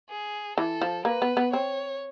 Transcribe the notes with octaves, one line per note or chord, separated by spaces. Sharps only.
G#4
E3 A4
F3
A#3 B4
B3
B3
C4 C#5